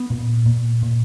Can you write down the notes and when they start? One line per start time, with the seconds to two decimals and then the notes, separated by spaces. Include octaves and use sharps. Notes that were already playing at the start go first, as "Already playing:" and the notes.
Already playing: B3
0.10 A#2
0.46 A#2
0.83 A#2